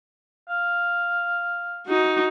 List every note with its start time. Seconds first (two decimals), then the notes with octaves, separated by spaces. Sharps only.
0.49 F5
1.87 D#4 F#4